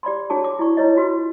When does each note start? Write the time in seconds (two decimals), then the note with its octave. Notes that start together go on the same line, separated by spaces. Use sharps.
0.03 G4 D5 B5 C6
0.30 D4 F#4 G#4 C#5 A5
0.44 D6
0.59 E4 D5 C#6
0.77 D#4 E4 B4 C#5 D#5
0.96 F4 F#4 B4 C6